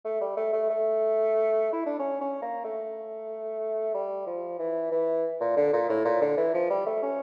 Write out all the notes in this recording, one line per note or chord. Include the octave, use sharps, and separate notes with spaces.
A3
G3
A3
A3
A3
E4
D4
C#4
C#4
A#3
A3
G3
F3
E3
E3
A#2
D3
A#2
A2
A#2
D3
E3
F3
G3
A3
C#4